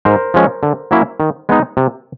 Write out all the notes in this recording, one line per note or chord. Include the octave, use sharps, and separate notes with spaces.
G#2 A#4 C5
F3 G#3 C#4
D3
F#3 A#3 C#4 E4
D#3
G#3 B3 D#4
C3